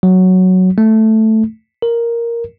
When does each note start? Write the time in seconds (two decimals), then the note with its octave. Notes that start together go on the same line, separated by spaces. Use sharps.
0.03 F#3
0.78 A3
1.82 A#4